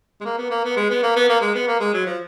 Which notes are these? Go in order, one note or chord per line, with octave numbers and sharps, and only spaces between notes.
G#3
A#3
B3
A#3
B3
G#3
B3
A#3
B3
A#3
G#3
B3
A#3
G#3
F#3
F3